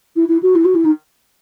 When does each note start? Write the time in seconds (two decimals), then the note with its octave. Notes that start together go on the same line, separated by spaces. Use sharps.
0.16 E4
0.29 E4
0.43 F#4
0.55 E4
0.65 F#4
0.75 E4
0.85 D#4